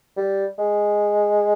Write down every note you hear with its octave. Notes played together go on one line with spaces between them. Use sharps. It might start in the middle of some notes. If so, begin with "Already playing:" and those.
G3
G#3